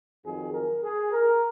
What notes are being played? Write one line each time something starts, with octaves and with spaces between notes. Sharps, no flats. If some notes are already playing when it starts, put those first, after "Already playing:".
F2 D#3 F#3 G#4
A#4
G#4
A#4